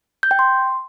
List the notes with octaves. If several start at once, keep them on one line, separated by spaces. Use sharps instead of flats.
G6
G5
C6